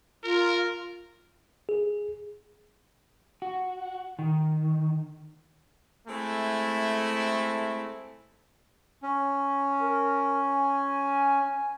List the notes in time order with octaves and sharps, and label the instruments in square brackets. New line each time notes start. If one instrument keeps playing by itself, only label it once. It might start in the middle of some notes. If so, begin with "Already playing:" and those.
[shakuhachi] F4 [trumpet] A#4
[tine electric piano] G#4
[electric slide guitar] F#4
D#3
[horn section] G#3 A3 C4 E4
[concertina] C#4
[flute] A#4
G#5